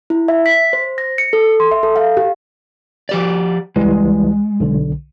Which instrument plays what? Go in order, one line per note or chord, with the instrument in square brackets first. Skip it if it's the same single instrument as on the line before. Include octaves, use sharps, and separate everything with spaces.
[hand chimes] E4
E5
B6
C5
A#6
C#7
A4
C6
E5
A4
F5
G4
[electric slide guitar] F3 G4 D5
[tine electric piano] C#2 E3 G3 [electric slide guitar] G#3
[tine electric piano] B1 D3